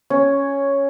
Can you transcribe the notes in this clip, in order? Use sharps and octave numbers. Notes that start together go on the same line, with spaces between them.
C#4